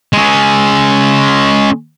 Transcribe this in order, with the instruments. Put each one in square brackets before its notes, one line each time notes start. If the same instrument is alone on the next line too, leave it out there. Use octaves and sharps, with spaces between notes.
[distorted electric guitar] G#3 C#4